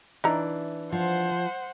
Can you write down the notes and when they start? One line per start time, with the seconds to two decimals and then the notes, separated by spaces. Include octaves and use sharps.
0.24 E3 D4 D#4 A#5
0.92 F3 C5 F#5